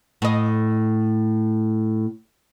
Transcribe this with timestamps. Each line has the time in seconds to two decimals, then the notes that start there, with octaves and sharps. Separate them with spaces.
0.22 A2 D#5